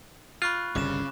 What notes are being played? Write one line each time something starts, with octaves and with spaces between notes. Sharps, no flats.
F4 B5 C#6 F#6
G1 C2 G2 C#3 D6 E7